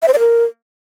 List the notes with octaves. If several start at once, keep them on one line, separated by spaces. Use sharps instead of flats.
E5
C5
D5
A#4